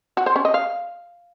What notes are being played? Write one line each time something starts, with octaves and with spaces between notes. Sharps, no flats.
F#4
C5
C#4
D#5
F5